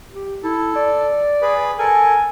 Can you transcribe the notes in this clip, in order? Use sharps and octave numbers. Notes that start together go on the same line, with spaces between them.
G4
E4 A4
D5
G#4 B4
A4 A#4 G#5